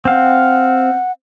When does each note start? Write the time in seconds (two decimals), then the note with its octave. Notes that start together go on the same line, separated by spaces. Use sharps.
0.05 C4 F5 F#5